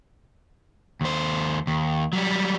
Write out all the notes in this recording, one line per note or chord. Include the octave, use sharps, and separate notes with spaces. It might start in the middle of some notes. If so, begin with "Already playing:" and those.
D#2 C5
D#2
F#3 G3